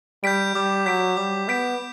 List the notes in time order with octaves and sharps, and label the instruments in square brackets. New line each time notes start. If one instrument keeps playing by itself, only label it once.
[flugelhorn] G3 [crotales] G6 B6 D7
[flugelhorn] G3 [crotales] D6
[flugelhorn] F#3 [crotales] G6 B6 D7
[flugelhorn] G3 [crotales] D6
[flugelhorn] B3 [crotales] G6 B6 D7